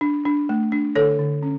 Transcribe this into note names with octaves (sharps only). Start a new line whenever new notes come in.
D4
D4
A3
D4
D3 A4 C#5
D3
C#4